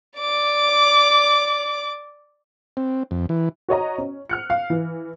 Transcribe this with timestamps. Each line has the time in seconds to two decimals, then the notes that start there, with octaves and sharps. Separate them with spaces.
0.20 D5 D6
2.77 C4
3.11 F2
3.29 E3
3.69 F#4 C#5 D#5 A#5
3.98 C#4
4.29 F6 F#6 C#7
4.50 F5
4.70 E3